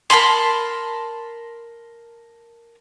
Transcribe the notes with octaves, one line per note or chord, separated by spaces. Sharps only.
A#4 A5 B5 C6